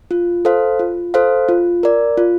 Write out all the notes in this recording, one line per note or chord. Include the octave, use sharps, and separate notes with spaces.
F4
A4 C5 F5
F4
A4 C5 F5
F4
A#4 D5
F4